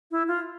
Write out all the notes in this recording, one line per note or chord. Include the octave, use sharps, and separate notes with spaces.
E4
F4